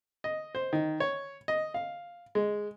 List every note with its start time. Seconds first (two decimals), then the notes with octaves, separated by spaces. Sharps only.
0.24 D#5
0.55 C5
0.73 D#3
1.00 C#5
1.48 D#5
1.74 F5
2.35 G#3